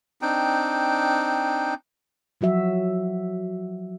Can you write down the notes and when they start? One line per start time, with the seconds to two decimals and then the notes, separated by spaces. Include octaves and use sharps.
0.22 C4 D4 D#4 G5
2.41 F3 F#3 F#4 E5